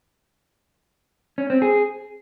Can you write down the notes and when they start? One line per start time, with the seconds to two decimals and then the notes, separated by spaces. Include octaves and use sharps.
1.38 C#4
1.50 C4
1.62 G#4